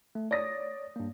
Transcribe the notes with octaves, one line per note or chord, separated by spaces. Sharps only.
A3
C#5 D5 D#6 A#6
G2 A#3